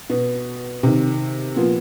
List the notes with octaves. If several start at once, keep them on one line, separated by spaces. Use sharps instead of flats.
B2 B3
C3 D#3
A#2 F3 B3